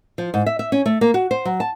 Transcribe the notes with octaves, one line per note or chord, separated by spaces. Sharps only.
F3
G#2
E5
E5
C#4
A3
A#3
F#4
C5
F#3
A5